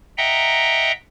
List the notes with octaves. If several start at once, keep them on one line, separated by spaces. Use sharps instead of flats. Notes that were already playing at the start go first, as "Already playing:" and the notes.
D#5 E5 F#5 G5 A#5